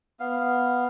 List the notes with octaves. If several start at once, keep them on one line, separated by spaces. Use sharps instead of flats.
B3 F5